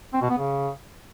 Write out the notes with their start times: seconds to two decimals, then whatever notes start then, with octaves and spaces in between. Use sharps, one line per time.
0.13 C4
0.22 B2
0.30 B3
0.38 C#3